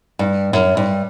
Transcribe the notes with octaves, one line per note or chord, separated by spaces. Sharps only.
G2
F#2
G2